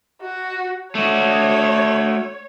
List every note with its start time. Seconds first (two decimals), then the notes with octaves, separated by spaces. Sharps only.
0.22 F#4
0.95 A3 F#4 C#5